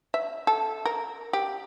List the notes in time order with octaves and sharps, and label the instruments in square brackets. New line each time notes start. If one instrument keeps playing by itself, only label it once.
[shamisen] E5
A4
A#4
G4